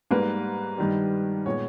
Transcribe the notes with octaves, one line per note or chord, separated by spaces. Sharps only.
G#2 G3 A#3 B4
G2 D#3 G3
A#2 G#3 B3 C#5